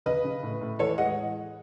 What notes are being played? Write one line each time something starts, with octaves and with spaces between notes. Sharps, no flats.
C#3 B4 D#5
C#3
A2
A2
E3 A4 C#5
G#3 D#5 F#5